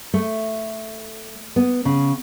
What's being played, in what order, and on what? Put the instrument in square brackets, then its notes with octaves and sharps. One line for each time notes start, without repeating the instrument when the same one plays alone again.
[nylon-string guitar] A3
B3
C#3